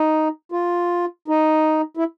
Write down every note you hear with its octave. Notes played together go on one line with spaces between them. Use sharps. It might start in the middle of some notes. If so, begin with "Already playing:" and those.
Already playing: D#4
F4
D#4
E4